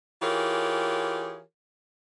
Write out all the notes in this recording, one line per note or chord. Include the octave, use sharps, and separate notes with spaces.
E3 F4 G4 G#4 A#4 C#5